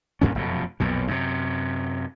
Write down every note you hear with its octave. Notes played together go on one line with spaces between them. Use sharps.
D2 G2 A#2 C#4
F1 F#2 B2
B1 F2 A#2
F#2 C3